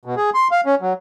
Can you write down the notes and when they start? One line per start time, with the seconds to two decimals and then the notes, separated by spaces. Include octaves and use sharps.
0.05 B2
0.17 G#4
0.34 C6
0.52 F5
0.66 C#4
0.81 F#3